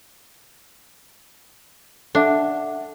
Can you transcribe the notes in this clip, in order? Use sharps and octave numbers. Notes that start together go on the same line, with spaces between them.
D4 A4 E5 F#5